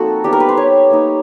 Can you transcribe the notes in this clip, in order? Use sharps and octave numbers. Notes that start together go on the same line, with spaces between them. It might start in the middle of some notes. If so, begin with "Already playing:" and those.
Already playing: F3 A#3 C4 D#4 F#4 A4
G3 B3 D#4 G4
A#4
B4
C5
C#5
A#3 D#4